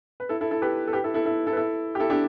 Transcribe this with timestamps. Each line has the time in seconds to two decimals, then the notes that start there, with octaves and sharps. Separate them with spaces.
0.20 B4
0.29 E4 A4
0.41 E4 A4
0.51 E4 A4
0.62 G4 B4
0.87 A4
0.93 G4 B4
1.04 E4 A4
1.14 E4 A4
1.25 E4 A4
1.47 E4 A4
1.53 B4
1.57 E4 A4
1.95 G4
2.00 E4 A4
2.10 D4 G4